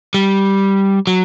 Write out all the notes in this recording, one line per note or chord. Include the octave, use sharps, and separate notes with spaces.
G3
F#3